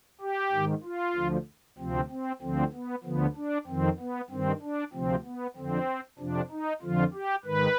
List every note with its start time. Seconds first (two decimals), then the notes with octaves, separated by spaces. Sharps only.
0.21 G4
0.52 G#2 D#3
0.84 F4
1.15 D2 D3 F3
1.78 D2 C3 F3 C4
2.10 C4
2.42 D2 D3 F3 C4
2.73 B3
3.04 D2 D3 F3 B3
3.36 D4
3.67 F2 D#3 C4
3.99 B3
4.30 G2 D#3 C4
4.62 D4
4.93 D2 C3 F3 C4
5.25 B3
5.56 F2 D3 F3 C4
6.19 F2 C3 F3 D4
6.51 D#4
6.82 F2 D3 F3 F4
7.14 G4
7.45 G#2 D#3 B4